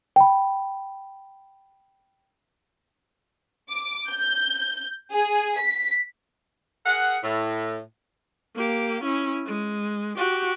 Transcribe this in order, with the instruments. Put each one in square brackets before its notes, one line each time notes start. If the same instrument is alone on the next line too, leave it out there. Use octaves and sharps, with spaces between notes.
[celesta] G5 B5
[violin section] D6
G6
G#4
B6
[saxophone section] G#4 A#4 F#5
A2
[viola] A#3 G4
C#4 E4
G#3
F#4 G4